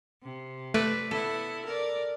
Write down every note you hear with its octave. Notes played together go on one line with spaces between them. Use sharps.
C3
A3 B4 D5
B3 E4 A4
A#4 D5